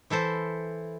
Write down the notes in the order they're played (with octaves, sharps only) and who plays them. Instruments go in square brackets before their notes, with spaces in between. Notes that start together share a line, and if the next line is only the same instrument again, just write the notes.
[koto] E3 E4 A4 C5